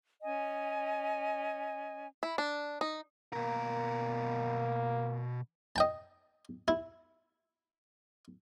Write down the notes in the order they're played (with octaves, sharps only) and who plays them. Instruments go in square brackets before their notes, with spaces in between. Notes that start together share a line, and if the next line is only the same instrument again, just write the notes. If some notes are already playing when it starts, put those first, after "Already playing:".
[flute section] C#4 D#5 G#5
[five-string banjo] E4
D4
D#4
[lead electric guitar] B2 A#4 [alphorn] A#3
[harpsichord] D#5 G5 A5
E4